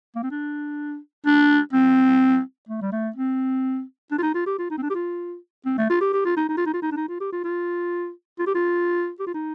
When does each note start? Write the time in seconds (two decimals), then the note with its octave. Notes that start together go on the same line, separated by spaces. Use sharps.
0.15 A#3
0.23 C4
0.31 D4
1.26 D4
1.73 C4
2.69 A3
2.82 G3
2.93 A3
3.16 C4
4.11 D4
4.19 F4
4.23 D#4
4.35 F4
4.46 G4
4.59 F4
4.70 D#4
4.78 C4
4.83 D4
4.90 G4
4.95 F4
5.66 C4
5.78 A3
5.90 F4
6.01 G4
6.13 G4
6.25 F4
6.37 D#4
6.49 D#4
6.57 F4
6.66 D#4
6.74 F4
6.82 D#4
6.92 D4
6.97 D#4
7.08 F4
7.20 G4
7.32 F4
7.44 F4
8.39 F4
8.47 G4
8.55 F4
9.20 G4
9.27 F4
9.34 D#4